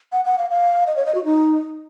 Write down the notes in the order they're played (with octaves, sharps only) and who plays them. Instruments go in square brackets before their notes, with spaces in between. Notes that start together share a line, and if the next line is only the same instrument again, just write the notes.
[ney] F#5
F#5
F5
F5
D#5
C#5
D#5
F#4
D#4